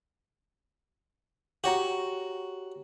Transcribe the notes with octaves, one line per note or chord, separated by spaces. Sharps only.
F#4 G4 C#5 A#5